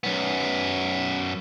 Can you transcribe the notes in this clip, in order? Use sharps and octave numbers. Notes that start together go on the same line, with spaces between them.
F#2 B3